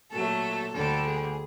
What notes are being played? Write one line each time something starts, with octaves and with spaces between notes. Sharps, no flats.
A#2 F#3 A3 A4
D2 D3 G3 A4
G#4